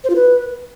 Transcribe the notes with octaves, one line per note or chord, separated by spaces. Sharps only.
C5
F4
B4